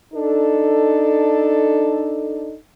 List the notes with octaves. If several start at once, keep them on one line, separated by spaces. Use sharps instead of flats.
D4 D#4 A4